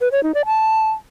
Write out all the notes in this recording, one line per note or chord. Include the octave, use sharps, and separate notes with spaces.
B4
C#5
D#4
D5
A5